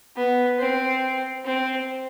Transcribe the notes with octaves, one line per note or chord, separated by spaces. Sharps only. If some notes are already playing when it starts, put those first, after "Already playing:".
B3
C4
C4